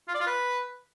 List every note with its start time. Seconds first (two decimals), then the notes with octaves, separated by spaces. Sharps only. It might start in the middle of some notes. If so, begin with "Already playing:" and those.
0.08 F4
0.14 D5
0.21 F4
0.27 B4